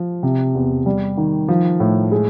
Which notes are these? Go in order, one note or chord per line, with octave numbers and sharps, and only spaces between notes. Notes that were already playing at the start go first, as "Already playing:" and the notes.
Already playing: F3
C3
E2
G3
D#3
F3
A2
G#3